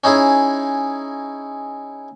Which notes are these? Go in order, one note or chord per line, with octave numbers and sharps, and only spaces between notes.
C#4 D#4 E4 G#4